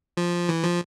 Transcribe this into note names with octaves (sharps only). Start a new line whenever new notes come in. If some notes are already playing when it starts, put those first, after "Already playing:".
F3
E3
F3